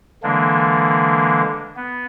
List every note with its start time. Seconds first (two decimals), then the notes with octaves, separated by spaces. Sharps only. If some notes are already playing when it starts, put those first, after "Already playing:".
0.23 D3 E3 G#3 A#3 D4
1.76 B3